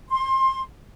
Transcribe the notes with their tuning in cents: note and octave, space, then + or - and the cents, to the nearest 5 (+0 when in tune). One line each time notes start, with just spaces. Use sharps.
C6 +25